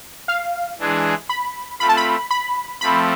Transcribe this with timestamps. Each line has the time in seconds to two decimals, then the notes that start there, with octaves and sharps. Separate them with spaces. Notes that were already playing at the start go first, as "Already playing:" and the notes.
0.28 F5
0.79 E3 G#3 D4 G#4
1.29 B5
1.80 A3 C4 F4 B5
1.89 A5
1.97 B5
2.31 B5
2.81 F3 A3 C4 B5